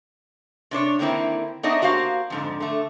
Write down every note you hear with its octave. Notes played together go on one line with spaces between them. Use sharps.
C3 D4 C5 C#5
D3 D#3 A#3 C4 E4
B3 D4 D#4 C#5 D#5 E5
A#3 F#4 G4 C5 F5
F2 G#2 D3
D3 A3